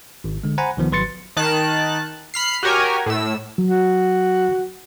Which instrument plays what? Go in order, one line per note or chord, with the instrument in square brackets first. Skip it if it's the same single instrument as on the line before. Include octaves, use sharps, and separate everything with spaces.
[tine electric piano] G#1
D3 G#3
C5 F#5 G#5 A#5 B5
C2 D#3 F3 B3
G#1 F#3 B4 C6 A6 C#7
[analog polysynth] D#3 A5 F#6
B5 F6 C7
F#4 G4 A#4 C#5 G#5
A2 E6
[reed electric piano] F#3
[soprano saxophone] F#4